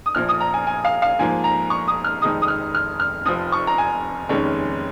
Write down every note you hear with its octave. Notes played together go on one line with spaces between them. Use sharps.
D#6
A#1 A#2 F3 F6
D#6
A#5
G#5
G#5
F5
F5
G#2 F3 A#3 G#5
A#5
C#6
D#6
F6
F1 F2 D#3 G#3 D#4 D#6
D#6
F6
F6
F6
F1 F2 F3 D#6
C#6
A#5
G#5
F1 D#2 D#3 G#3 C#4